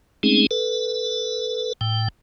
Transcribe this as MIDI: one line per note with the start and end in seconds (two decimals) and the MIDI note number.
0.23 0.46 56
0.23 0.46 57
0.23 0.46 60
0.23 0.46 61
0.23 0.46 63
0.23 0.46 68
0.51 1.73 69
0.51 1.73 71
1.81 2.08 45
1.81 2.08 79